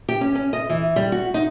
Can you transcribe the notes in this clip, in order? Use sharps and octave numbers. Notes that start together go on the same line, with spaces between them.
G4
C#4
C#4
D#5
E3
G3
F#4
D#4